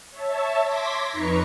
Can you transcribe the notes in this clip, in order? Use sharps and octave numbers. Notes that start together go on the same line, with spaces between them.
C#5 E5 A5
C6 D6 G#6 A#6 B6
F2 D#4 B4 A#5 C#6 C#7